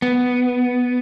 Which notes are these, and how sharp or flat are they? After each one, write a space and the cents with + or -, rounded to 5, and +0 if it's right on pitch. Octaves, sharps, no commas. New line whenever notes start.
B3 +5